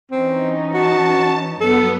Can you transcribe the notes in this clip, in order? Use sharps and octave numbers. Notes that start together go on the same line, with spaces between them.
E3 C4 C#4 D#4
F#4 A5
G2 F#3 B3 A4